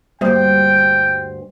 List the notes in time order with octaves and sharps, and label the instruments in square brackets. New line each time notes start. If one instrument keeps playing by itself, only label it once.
[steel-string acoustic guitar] D2 G2 C5 [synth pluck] G3 [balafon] A#3 G4 [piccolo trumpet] G5